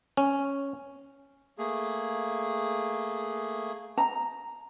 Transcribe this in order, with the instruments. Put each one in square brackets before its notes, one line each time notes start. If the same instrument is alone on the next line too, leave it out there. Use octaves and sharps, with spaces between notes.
[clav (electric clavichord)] C#4
[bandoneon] A3 A#3 G#4
[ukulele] A#5